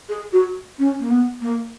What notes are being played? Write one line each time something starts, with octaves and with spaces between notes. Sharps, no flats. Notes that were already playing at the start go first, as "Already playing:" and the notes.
G#4
F#4
C#4
A#3
B3
A#3